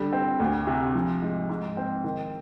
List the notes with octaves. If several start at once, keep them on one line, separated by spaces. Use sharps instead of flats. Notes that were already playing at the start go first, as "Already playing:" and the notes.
Already playing: D3 G3
C4
D2
C3
F3
G#2
G#2
C4
D#3